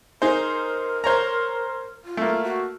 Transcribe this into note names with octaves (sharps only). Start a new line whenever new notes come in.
D#4 G#4 A#4 C5
C5 C#5 A#5
F4
A3 A#3
F#4